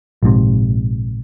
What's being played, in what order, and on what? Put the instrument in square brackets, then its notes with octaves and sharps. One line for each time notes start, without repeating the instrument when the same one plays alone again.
[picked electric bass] A#1 G#2 C3